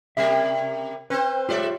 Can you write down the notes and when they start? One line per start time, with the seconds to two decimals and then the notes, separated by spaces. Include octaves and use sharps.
0.17 C3 G3 A#3 A#4 E5
1.10 C4 B4 C5
1.49 G#3 F4 G4 C#5 D5 E5